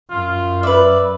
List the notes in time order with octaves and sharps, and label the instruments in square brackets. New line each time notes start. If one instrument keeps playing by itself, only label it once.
[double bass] F#2 [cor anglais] F4
[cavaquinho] B4 E5 [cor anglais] D5